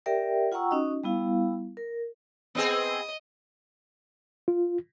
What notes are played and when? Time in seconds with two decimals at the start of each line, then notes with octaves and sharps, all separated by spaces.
0.06 G4 A#4 D5 E5 G5
0.52 F4 F#5 G5 A#5 C#6 E6
0.71 C#4 D#4 F#4 D#5
1.04 G3 B3 E4 F5
1.77 A#4
2.55 B3 C4 G#4 D#5
4.48 F4